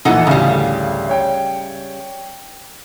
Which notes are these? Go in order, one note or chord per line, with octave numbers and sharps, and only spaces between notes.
A#1 E3 D#4 A4 F#5
A1 D2 C#3 G3 F5
C#5 G5